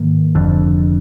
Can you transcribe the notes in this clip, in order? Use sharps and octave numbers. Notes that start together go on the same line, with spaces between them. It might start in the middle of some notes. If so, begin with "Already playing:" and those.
Already playing: G#2 D#3 A#3
F1 F2 D3